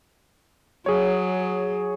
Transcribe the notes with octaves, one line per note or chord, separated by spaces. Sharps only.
F#3 G#4 C#5